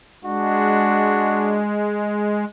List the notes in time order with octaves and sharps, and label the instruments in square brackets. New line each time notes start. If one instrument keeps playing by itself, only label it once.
[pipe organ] G#3 [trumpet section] D4 F#4